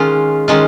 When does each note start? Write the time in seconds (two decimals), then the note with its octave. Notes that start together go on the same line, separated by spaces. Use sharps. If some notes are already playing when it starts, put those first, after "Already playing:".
Already playing: D#3 G#3 C#4 F4
0.48 D#3 G#3 C#4 F4